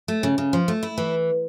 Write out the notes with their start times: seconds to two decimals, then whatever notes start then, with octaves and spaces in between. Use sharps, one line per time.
0.08 A3
0.23 C#3
0.38 C#3
0.53 F3
0.68 A3
0.83 E4
0.98 E3